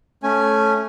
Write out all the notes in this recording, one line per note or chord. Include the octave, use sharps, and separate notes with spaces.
A3 C#4 G#5